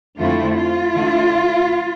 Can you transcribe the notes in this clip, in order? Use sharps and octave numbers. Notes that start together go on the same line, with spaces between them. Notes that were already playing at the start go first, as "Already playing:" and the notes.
F2 D3 A3 C4 E4 F4
F4
D3 A3 E4